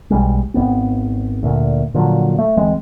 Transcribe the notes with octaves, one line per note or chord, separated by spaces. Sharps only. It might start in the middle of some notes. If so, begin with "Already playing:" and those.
B1 G3 G#3
G#1 A2 B3 C4
D2 A#2
A#2 D3 F3 F#3
A3
D1 E3 G#3 C4